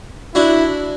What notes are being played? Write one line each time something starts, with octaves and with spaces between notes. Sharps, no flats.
D4 E4 F#4